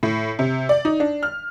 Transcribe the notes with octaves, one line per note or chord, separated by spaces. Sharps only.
A2
C3
D5
D#4
D4
F6